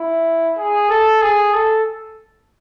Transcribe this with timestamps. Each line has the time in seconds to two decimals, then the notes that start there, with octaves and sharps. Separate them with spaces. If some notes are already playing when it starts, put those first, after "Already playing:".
Already playing: E4
0.57 G#4
0.90 A4
1.22 G#4
1.53 A4